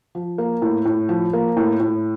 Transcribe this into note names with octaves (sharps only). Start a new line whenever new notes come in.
F3
A#3
A2
A2
F3
A#3
A2
A2